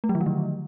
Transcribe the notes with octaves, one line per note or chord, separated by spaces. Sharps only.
A3
F#3
D#3
F3
D3